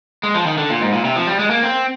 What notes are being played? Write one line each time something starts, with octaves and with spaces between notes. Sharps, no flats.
G#3
F3
D#3
D3
A#2
G#2
A#2
C3
F3
G3
G#3
A#3
C4